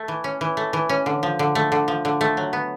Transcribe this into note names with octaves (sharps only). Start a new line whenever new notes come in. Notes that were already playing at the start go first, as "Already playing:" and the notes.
Already playing: A3
E3
C#4
E3
A3
E3
C#4
D3
F3
D3
A3
D3
F3
D3
A3
F#3
B3